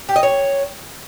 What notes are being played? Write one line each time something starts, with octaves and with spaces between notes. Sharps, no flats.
G4
D#5
C#5